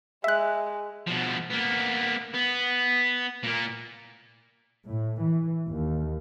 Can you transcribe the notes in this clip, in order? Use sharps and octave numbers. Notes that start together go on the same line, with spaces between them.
G#3 E5 F#6
B2 F3
A#3 B3
B3
A#2 A#3
A2
E3
D#2